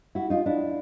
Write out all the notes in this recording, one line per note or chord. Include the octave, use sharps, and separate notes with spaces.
E4 F#4
D#4 F4
D4 E4